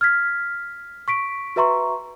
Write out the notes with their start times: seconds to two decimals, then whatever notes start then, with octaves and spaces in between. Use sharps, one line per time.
0.01 F6 G#6 B6
1.08 C#6 B6 D7
1.56 F#4 B4 E5 A#5 C6 C#6